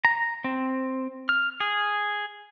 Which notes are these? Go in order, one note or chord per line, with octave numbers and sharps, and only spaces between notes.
A#5
C4
F6
G#4